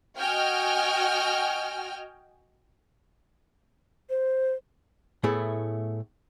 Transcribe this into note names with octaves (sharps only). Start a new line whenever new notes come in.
F#4 D#5 G5 G#5 F6
C5
A2 A3 B3 E4 G#4